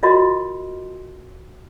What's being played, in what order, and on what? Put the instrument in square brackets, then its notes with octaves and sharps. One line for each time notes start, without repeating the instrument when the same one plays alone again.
[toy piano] F4 F#4 A#4 D#5 C6